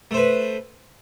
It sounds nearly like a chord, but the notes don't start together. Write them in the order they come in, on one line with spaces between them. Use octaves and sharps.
A3 C5 B4